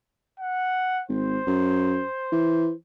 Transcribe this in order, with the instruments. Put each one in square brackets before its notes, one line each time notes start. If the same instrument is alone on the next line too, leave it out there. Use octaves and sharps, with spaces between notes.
[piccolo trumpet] F#5
[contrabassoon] G#1 [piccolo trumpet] C5
[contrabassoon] F#2
E3